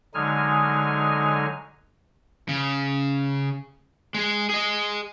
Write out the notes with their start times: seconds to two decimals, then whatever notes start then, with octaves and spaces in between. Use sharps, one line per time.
0.14 D3 F#3 G#3 D#4 G#5 F6
2.49 C#3
4.14 G#3 G#4
4.49 G#4 D#5